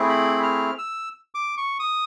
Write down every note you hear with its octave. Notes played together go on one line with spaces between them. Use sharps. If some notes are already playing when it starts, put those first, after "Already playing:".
Already playing: A3 C4 E4 G#4
B5
F6
E6
D6
C#6
D#6